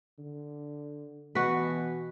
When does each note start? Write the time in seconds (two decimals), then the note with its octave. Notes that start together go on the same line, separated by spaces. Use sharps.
0.19 D3
1.35 B2 E3 F#4 B4